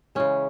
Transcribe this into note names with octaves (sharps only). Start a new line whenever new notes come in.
C#3 E3 G#3 C#4